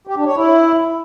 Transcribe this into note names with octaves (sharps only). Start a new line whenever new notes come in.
G4
D4
C#5
E4